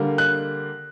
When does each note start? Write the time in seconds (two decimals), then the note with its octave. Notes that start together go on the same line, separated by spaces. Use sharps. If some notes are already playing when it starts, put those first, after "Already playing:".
Already playing: D3 G3 A#3
0.18 F#6